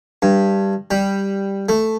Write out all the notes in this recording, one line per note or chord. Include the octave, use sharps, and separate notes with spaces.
G2
G3
A3